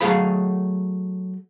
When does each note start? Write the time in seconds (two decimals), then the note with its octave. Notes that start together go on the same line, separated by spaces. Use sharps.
0.01 F#3 A3 G#4 F5 B5